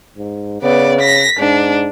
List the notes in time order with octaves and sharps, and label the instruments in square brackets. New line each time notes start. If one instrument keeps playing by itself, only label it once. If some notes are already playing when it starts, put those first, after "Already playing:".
[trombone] G#2
[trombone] C#3 [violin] B3 D5
[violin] A#6 B6
[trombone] G#2 [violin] D4